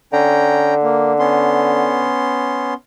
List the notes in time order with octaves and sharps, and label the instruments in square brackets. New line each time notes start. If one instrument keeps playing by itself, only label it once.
[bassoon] D3 [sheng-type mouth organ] C#4 G5 A#5
[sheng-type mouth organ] A#3
B3 C#4 C6